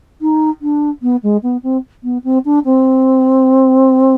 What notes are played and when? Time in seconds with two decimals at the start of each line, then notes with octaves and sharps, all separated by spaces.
0.22 D#4
0.62 D4
1.02 B3
1.23 G#3
1.43 B3
1.63 C4
2.04 B3
2.24 C4
2.45 D4
2.65 C4